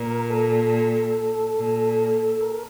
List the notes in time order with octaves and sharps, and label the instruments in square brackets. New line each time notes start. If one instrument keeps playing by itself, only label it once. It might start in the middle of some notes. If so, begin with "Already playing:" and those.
Already playing: [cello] A#2 [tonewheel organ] A#4
[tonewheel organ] A4
[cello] A#2
[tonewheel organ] A#4